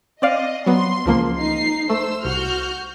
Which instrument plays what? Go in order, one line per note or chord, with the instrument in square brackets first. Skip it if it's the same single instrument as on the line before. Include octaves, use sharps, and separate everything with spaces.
[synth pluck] C4 D5 F5 [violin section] D#5
[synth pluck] F#3 B3 [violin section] C6
[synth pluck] C#2 F3 A#3
[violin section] D#4 C7
[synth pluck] A3 [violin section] C5 E6
[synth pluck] C2 [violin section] F#4 F6 G6